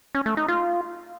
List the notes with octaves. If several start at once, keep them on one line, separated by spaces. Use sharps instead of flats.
C#4
A3
D#4
F4